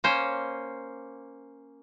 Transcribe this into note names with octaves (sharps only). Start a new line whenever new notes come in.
A#3 C#4 C5